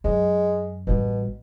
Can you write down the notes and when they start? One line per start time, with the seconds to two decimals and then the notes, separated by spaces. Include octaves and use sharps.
0.04 F#2 G#3
0.87 A1 B2 G3